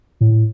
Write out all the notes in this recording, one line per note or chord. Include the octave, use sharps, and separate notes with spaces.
A2